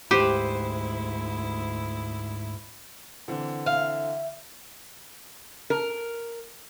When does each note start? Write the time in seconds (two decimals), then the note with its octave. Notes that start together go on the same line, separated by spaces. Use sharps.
0.11 D2 G#2 E4 G4 B4 C5
3.28 D3 E3 C4
3.66 E5 F5
5.70 A#4